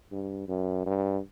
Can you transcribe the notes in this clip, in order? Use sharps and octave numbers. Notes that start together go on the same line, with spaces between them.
G2
F#2
G2